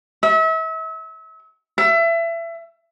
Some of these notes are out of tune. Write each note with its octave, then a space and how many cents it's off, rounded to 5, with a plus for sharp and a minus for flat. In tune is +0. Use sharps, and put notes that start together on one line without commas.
E5 -35
E5 +25